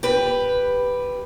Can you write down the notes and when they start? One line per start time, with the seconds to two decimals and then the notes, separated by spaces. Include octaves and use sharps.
0.03 G4 B4